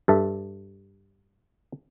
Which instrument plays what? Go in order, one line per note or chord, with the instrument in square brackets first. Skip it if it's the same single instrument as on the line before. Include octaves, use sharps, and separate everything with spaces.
[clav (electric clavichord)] G2 A4 E5